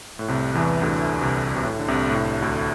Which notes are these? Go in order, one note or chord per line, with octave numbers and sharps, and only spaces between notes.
A2
C2 C3
E2 E3
D2 D3
C2 C3
C3
A2
D3
C2 C3
A2
C2 C3
D2 D3